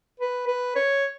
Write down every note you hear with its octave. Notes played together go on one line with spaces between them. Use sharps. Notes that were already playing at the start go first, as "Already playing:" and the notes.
B4
B4
C#5